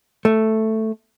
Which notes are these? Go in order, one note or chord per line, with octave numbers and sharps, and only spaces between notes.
A3